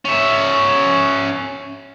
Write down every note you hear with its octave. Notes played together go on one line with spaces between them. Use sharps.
C#4 E5